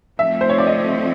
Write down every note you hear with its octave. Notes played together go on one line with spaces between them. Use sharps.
F3 A3 C4 E5
C5
C#5
D5
D#5